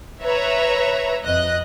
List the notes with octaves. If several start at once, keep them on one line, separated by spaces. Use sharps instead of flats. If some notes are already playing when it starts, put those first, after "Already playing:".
B4 C#5 E5 A#5
F2 D#5 F#6